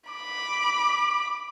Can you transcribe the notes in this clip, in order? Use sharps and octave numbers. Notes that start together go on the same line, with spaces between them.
B5 D6